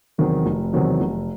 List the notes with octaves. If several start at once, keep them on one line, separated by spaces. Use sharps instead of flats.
E2 C3 D#3 F#3
F1
E2 C3 D#3 F#3
F1